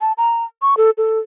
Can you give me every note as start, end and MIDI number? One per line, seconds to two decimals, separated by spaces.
0.01 0.12 81
0.18 0.44 82
0.62 0.77 85
0.77 0.90 69
0.98 1.19 69